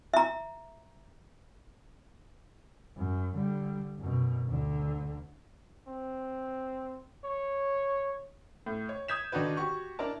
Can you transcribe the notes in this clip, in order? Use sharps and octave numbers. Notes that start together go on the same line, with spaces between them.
E5 A#5
F#2
D3 G3
F#2 B2
D2 D3
C4
C#5
A2
C#5
D#6 G6 G#6 B6 E7
D3 D#3 D4 D#4 F#4 B4
F#4 G4 C#6
D4 E4 A#4 A5